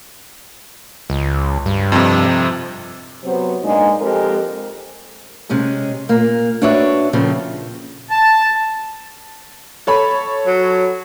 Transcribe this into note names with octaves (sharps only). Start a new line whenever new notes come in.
C#2
G2
F2 C3
C3 F#3 B3 C5
A#2 G#3 A#3 D4 D#4
F2 G#3 G4 A#4
C3 G#3 C#4 G#4
A#2 A#3
D4 F#4 B4 C#5 D5 E5
A#2 C#3 F3 C4 A4
A5
A4 C#5 B5
F#3